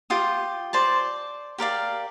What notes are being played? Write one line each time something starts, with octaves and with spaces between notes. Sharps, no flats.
F4 G4 D#6
C5 D5 A5
G4 A#4 D5 F5